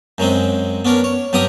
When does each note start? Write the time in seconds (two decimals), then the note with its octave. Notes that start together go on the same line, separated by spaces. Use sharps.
0.18 F#2 F#3 G#3 C4
0.85 B3 C#4 D4 A#4
1.04 C#5
1.33 G2 F#3 C#4 G4 A#5 D#6